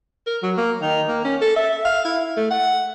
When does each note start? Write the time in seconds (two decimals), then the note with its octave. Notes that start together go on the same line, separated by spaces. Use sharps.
0.27 A#4
0.43 F#3
0.57 A#3
0.82 D#3
1.08 A#3
1.24 C#4
1.41 A4
1.56 E5
1.85 F5
2.05 E4
2.37 A3
2.51 F#5